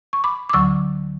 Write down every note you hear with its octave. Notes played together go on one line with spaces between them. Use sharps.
C#6
B5 D6
D6
D2 D3 F#3 C#6 E6